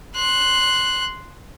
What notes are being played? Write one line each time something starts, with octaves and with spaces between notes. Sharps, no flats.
C6 F#6